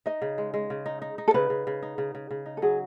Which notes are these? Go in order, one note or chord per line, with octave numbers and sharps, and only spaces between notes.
D#4 D#5
C#3
G#3
G#3
C#3
D#4
D#4
D#4
A4
C#3 B4
C#3
C#3
D#4
C#3
C#3
C#3
D#4
A4
F#3 G#4